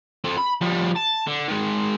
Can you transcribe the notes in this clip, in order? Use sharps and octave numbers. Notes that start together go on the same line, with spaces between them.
C4 A4
B5
F3 G3
A5
D3
D#3 G#3